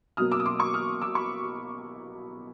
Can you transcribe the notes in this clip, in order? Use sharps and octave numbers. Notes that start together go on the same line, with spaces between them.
B2 F#3 A#3 D#6 F6
D6 E6
D#6
C6 D6
C#6 D#6
D#6 F6
D6 E6
B5 C#6